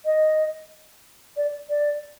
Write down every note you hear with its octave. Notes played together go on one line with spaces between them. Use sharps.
D#5
D5
D5